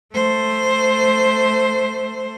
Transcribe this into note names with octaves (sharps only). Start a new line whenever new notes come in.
A3 C5